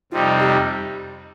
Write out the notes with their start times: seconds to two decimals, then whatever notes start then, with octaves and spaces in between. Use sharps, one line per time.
0.12 F2 C3 G3 D#4 F4
0.40 G4